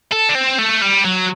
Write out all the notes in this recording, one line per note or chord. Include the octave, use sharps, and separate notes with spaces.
A4
D4
C4
A3
G3
F#3